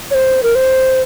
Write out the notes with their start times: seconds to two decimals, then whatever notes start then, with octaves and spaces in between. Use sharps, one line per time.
0.11 C#5
0.14 C5
0.43 A#4
0.55 C5